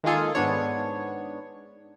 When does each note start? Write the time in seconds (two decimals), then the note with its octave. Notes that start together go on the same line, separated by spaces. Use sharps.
0.04 D#3 G#3 A#3 F4 G#4 A4
0.35 G#2 B3 D4 C#5